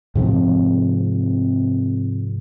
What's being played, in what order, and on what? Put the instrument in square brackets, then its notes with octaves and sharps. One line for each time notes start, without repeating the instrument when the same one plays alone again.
[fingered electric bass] G#2 C3 F3 C4